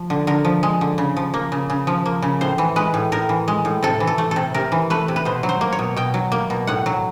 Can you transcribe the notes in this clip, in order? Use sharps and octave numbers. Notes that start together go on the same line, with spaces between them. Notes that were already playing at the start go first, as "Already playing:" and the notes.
Already playing: F3
D3
D3 A#4
F3
G#3
D3
C#3
F3
A#3
C#3
C#3
F3
A#3
C#3
A2 C5
E3
G#3 B4
A2
A2 A#4
E3
G#3
A2
C3 A4
E3
A4
A3
C3 A4
C3 A#4
E3
A3 B4
C3
B4
B2 C5
F#3
C5
A#3
C#5
B2
B2 G5
F#3
A#3
B2
A2 F#5
F#3